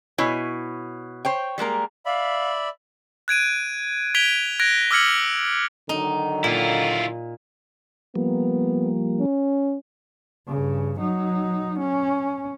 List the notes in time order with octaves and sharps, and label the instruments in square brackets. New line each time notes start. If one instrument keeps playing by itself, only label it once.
[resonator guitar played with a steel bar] B2 E4 C#5 G#5
C5 C#5 G5
G3 G#3 A#3 A#4
[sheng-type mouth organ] D5 E5 B5 [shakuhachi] F5
[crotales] F#6 G#6 D7 D#7
G#6 B6 D7 F7 G7
F#6 G#6 A#6 D7
D6 E6 F6 G#6 C#7 F#7
[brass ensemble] D3 D#3 F#3 [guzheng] D#4
[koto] A#2 [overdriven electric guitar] E4 F4
[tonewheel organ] F3 G3 A#3 [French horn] B3
[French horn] C#4
[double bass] G2 C#3
F#3 D#4
C#4